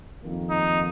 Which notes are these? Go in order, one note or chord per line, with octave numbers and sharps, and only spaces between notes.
F2 D#3 A#3
D#4